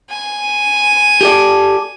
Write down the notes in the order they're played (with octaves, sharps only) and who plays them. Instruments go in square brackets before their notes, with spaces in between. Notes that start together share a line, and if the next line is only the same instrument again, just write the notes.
[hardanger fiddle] G#5
[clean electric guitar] G4 A4 D5